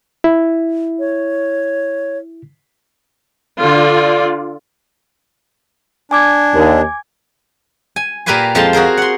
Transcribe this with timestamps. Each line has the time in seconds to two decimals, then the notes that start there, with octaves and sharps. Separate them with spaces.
0.24 E4
0.99 C#5
3.60 D3 F4 D5
6.11 D4 G#5 D6 G#6
6.54 D#2
7.96 G#5
8.26 A#2 G4 A#4 B4 G#5 C6
8.55 F2 F3 G#3 F4 A5 C6
8.73 F#4 G#4 A#4 C5
8.97 F#5 C6